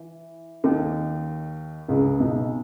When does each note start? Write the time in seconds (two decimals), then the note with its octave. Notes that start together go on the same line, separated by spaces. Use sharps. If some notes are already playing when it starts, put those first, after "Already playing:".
Already playing: E3
0.64 D#2 D#3
1.88 C#2 C#3
2.20 B1 B2